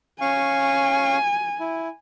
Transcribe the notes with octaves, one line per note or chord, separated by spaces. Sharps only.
C#4 F5 G#5 C#6
E4